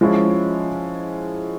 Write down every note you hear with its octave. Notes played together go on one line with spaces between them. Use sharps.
F3 G#3 C#4 E4